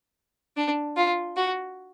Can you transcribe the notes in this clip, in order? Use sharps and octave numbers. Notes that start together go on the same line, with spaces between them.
D4
F4
F#4